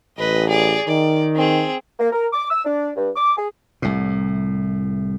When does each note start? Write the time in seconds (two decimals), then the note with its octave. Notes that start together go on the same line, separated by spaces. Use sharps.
0.18 A1 B4 D#5
0.49 G#4 D5
0.88 D#3 D5
1.36 C4 G#4
1.99 A#3
2.12 A#4
2.32 D6
2.49 E6
2.64 D4
2.95 G2
3.16 D6
3.37 G#4
3.82 C2 A2